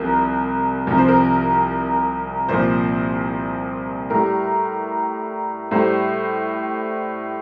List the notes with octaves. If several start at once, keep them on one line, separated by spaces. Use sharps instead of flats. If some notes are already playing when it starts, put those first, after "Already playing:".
Already playing: C2 F3 A#4
C2 C3 F3 A#4
C5
A#4
C2 A#2 F3 C5
A2 G3 A#4
A2 G3 C5